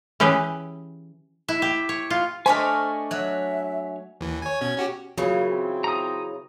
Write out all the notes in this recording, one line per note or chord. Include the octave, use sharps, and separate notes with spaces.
E3 C#4 G4 G#4 B4
E4
G4
C#5
F4
A3 D4 C5 D#5 G#5 C#6 F6 B6
F#3 E5 F#6
D#2 E3
C#5 G#5
B2 C#4 G#6
C#4 F#4 G4
C#3 E3 F#3 A#3 F4
C4
A#5 D#6